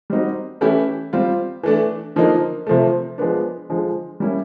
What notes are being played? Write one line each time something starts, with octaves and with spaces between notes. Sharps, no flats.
G3 C4 D#4 F#4
E3 A3 C#4 E4 G4
G3 C4 F4
E3 A3 D4
D3 F3 A#3 D#4
C3 F3 A3
F3 G#3 B3 D4
D3 F3 G#3
G3 A#3 C#4 E4